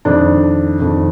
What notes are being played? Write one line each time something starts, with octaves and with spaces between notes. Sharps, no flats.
F2 D#3 D4
F2 D#3